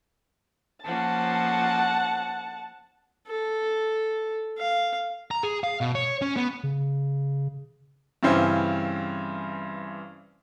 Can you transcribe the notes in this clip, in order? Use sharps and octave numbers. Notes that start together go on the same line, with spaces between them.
F3 A#3 C#4 F#5 A5
A4
F5
A#5
G#4
F5
B2
C#5
C#4
B3
C#3
G2 C#3 E3 C4 C#4